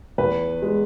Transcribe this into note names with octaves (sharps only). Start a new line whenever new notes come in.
E2 B4
G#3